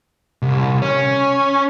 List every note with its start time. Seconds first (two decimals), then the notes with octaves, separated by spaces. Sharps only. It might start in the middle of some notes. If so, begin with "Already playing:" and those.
0.42 C2
0.82 C#4